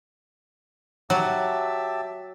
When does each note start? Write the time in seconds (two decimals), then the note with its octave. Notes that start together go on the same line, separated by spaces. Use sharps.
1.10 F#3 G4 E5 A5